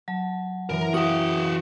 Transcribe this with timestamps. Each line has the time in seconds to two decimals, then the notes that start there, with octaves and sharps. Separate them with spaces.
0.08 F#3 A5
0.69 F#2 E3 A#4
0.94 F#4 G5 D#6